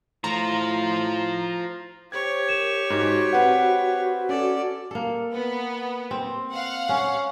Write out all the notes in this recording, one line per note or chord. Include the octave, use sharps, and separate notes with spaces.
A2 F4 C5 A#5
G4 C5 C#5 G#6
A#4 E7
G#2 F#4
C4 B4 C5 F#5
C#4 A4 D5
A#3 A4
B3
C4
F5 F#5
C#4